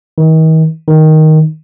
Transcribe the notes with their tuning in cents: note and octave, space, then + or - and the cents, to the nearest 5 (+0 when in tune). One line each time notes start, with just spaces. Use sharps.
D#3 +40
D#3 +5